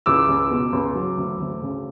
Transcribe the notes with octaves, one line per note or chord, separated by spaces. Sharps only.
C#2 D6 E6
C#2
B2
C#2
F#3
D2
D2
C#3